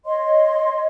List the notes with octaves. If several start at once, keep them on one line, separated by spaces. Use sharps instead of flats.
C#5 D#5 C6